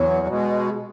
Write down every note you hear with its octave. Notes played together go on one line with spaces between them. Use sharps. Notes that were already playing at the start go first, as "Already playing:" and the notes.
Already playing: E2 F#3
B2 G#3